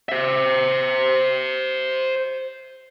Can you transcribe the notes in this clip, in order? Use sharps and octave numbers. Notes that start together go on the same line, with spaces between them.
C5 E5